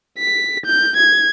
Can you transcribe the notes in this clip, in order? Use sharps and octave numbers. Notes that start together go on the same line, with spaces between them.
B6
G6
G#6